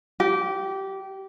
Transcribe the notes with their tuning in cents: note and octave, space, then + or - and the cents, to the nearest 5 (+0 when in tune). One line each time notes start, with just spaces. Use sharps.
G4 -20